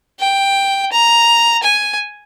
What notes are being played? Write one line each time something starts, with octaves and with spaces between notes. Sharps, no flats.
G5
A#5
G#5